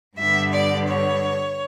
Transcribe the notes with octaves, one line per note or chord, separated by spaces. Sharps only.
G2 D3 G3 B3 E5
D5
C#5